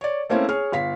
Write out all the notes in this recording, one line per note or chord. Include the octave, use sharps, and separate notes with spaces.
C#5 D5
A3 A#3 C4 C#4 E4
G#4 C#5 F6
G1 F5 B6